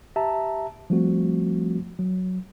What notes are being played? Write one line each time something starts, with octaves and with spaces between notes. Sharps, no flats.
G4 E5 A5 A#5
F3 G3 A3 C4 F#4
F#3